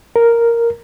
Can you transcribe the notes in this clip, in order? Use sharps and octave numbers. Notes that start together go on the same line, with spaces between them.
A#4